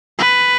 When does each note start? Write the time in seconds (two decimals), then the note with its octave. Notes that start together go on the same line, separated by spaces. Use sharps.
0.19 B4